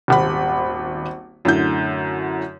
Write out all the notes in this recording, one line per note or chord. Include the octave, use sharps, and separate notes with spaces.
D#1 G#1 B5
F#2 A2 D3 G6